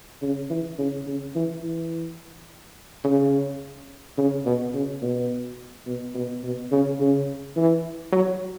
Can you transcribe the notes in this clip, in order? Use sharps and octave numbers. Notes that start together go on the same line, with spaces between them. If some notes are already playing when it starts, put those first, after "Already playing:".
C#3
E3
C#3
C#3
E3
E3
C#3
C#3
B2
C#3
B2
B2
B2
B2
C#3
C#3
E3
F#3